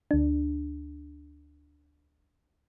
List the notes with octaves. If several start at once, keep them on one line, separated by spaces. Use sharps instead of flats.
D2 D4